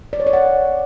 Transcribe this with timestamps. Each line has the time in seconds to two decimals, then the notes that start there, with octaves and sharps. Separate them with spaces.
0.13 D5
0.20 C#5
0.27 D5
0.33 F#5